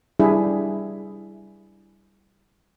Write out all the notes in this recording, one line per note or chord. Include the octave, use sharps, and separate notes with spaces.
G3 D4 E4 G#4